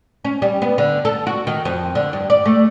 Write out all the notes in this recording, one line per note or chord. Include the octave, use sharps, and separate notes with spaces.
C#4
G3
B3
D3
A4
F#4
D#3
F2
D3
G2
D5
A3